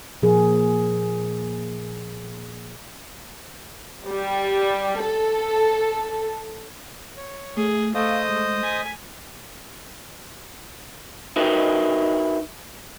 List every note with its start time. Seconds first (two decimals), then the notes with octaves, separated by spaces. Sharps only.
0.22 A#2 F3 G#4 A#4
4.05 G3
5.02 A4
7.17 C#5
7.57 A3 G#4
7.95 A3 C5 D#5 F5 D#6
8.28 G#3
8.63 G#5 B6
11.36 D#4 E4 F#4 A#4 B4